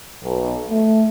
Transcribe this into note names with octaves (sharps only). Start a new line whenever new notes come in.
B1
A3